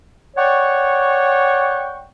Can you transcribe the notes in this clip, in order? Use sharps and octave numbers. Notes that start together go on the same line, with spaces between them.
C#5 D5 F#5 G5 C#6